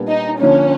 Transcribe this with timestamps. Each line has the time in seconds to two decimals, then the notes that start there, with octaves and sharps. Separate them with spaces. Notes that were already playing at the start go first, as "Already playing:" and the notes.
Already playing: A#2 G3 B3 D4
0.08 D#4
0.40 D3 F3 A#3 C#4 D#4